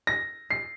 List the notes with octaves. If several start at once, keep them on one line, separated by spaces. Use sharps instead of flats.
A#6
C7